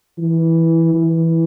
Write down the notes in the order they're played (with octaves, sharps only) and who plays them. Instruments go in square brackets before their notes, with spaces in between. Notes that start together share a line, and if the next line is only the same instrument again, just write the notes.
[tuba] E3
E3